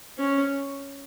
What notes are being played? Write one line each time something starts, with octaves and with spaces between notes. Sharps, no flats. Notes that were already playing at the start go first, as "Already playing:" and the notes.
C#4